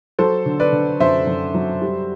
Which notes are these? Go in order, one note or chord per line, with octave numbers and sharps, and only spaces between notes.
F#3 A4 C5
D3
B4 D5
D3
F#2 C5 E5
F#2
F#3
G3